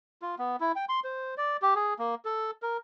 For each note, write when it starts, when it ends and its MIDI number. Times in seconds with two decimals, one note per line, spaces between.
0.22 0.35 65
0.39 0.56 59
0.61 0.72 64
0.76 0.85 79
0.89 1.00 84
1.04 1.35 72
1.37 1.57 74
1.62 1.74 67
1.76 1.94 68
1.99 2.15 58
2.25 2.51 69
2.62 2.77 70